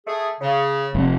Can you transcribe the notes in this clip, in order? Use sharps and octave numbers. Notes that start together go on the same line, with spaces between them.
A3 G#4
C#3
F1